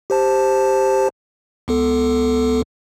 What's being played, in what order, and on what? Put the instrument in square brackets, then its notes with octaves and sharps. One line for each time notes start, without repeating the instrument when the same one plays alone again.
[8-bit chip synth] G4 C5 A5
C#2 B3 A4